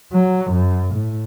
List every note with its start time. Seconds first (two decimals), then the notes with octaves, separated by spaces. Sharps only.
0.13 F#3
0.52 F#2
0.94 A2